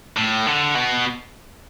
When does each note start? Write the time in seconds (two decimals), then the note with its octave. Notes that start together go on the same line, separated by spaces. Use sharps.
0.17 A2
0.47 D3
0.75 B2